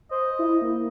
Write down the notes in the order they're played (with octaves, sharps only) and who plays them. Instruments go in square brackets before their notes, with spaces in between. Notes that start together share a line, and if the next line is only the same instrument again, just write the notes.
[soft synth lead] C5 [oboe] D#5
[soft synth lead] E4
A#3